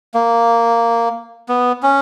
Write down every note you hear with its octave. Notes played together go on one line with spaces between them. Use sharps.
A#3
B3
C#4